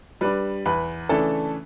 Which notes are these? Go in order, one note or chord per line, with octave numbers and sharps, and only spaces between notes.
G3 D4 B4 B5
E2 B4 B5
C#3 E3 A3 D4 A4 A5